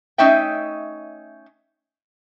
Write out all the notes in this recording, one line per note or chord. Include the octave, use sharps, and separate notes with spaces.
A3 C#4 D#4 D#5 E5 G5